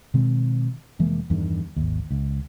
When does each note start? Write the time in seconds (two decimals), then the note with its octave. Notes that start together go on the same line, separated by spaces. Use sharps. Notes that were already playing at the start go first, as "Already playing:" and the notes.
0.14 B2 D#3 G#3 C4
0.99 F1 E3 G#3 A#3
1.30 E2 G2 D#3
1.77 G#1 D#2
2.11 C#2